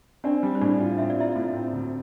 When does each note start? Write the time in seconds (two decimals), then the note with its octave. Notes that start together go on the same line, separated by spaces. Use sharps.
0.24 C4 D4 D5
0.43 G3
0.55 C5
0.61 A2 D4 D5
0.80 F4
0.98 C4 E5
1.10 D5
1.17 E4 F4 E5
1.35 A2
1.54 C4
1.73 D2